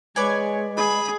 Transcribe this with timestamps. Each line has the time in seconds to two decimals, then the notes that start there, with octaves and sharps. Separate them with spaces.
0.16 G#3 B4 C#5 D5 G#5
0.77 G#4 B5